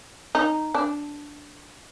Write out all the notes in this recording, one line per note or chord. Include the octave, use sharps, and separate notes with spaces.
D#4
D4